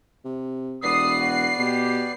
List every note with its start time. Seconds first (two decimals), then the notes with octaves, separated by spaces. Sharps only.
0.25 C3
0.83 E1 B3 B4 D5 D#6 C7
1.20 F#4
1.59 B2 G4